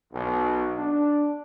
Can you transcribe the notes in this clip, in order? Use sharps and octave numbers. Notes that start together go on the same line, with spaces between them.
B1
D4